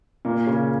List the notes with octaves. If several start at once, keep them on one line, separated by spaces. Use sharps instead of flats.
A#2 A#3
C#3 C#4